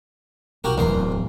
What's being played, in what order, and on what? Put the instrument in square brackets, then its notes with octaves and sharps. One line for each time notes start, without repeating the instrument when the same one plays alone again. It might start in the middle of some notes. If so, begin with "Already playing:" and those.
[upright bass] C2 [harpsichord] F#4 G4 A#4
[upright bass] D1 [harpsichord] E2 A#4 C6